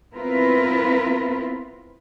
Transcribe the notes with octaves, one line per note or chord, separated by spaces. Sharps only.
B3 C4 E4 F4 A#4 B4